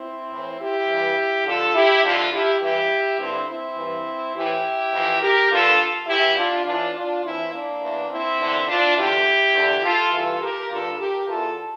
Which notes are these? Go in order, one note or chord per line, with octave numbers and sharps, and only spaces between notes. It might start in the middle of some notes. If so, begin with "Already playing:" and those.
Already playing: C4 E4
A2 E3
E4 G4
G2 E3
F2 D3 F4 A4
E4 G4
F2 D3 D4 F4
E4 G4
G2 E3 E4 G4
G2 D3 C4 E4
C4 E4
G2 E3
A2 E3 E4 G4
F2 E3
G4 A#4
G2 D3 F4 A4
E2 E3 E4 G4
D4 F4
A2 E3 D4 F4
D4 F4
A2 E3 C4 E4
A#3 D4
E2 E3
C4 E4
E2 D3
D4 F4
E2 D3 E4 G4
E2 D3
F4 A4
G2 E3 F4 A4
G4 A#4
G2 D3 F4 A4
G4 A#4
E2 E3 F4 A4